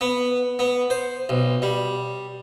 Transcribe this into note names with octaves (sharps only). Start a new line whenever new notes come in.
B3
B3
C5
B1
G3